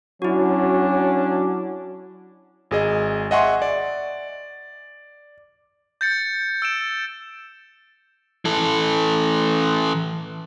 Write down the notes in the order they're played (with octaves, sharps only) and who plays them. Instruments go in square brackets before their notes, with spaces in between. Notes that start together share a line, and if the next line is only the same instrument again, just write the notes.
[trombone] F#3 [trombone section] C#4 D4 [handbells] E4 F#4
[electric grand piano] G#1 G#4 D#5
D#5 E5 F#5 G#5 C6 C#6
D5
[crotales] G6 A6 C#7
E6 D7 E7
[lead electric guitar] E3 A4